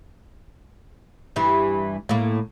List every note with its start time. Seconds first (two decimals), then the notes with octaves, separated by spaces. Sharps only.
1.36 G2 E3
2.09 A2 A#3